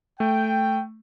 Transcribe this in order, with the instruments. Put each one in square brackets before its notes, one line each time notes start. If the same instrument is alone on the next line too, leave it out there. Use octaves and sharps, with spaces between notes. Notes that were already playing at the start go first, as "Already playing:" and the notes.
[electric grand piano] A3 [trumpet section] G5